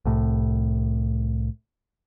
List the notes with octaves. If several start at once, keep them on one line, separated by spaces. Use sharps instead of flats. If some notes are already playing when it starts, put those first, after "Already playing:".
C2 A2